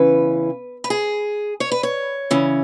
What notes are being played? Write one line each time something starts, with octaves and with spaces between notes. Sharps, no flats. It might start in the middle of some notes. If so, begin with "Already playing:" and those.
Already playing: E2 C#3 E3 C#4 B4
B4
G#4
C#5
B4
C#5
C#3 E3 C#4